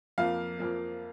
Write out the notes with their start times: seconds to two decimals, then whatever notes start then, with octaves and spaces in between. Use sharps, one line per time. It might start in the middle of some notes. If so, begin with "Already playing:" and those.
0.18 F2 F3 A#3 F5
0.59 F2 F3 A#3